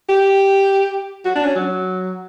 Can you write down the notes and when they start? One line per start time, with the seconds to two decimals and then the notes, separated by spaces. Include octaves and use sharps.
0.09 G4
1.25 F#4
1.36 D4
1.45 C#4
1.56 F#3